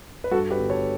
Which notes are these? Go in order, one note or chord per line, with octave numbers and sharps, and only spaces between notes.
B4
G2 F#4 A4
G4 B4
G1
A4 C#5